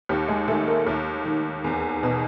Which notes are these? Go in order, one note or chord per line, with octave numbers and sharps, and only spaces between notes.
D#2 G4
G#3 G#4
D#3 A3 A4
A#3 A#4
D#2
D#3
E2
B2